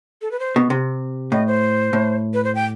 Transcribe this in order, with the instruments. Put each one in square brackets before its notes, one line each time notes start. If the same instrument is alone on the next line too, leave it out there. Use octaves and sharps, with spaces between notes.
[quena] A4
B4
C5
[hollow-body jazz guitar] B2
C3
[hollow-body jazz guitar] A2 [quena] D#5
[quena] C5
[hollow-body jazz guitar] A2
[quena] B4
C5
G5